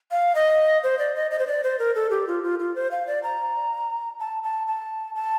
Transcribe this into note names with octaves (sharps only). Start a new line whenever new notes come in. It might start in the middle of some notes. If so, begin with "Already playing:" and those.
F5
D#5
C5
D5
D#5
D#5
C5
D5
C5
A#4
A4
G4
F4
F4
F4
C5
F5
D5
A#5
A5
A5
A5
A5